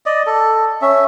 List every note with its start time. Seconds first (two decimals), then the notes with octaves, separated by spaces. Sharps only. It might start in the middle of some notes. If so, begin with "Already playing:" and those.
0.06 D5 D#5
0.27 A4
0.82 C#4 E5